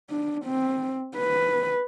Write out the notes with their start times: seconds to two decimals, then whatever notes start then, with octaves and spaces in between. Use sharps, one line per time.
0.10 D4
0.45 C4
1.17 B4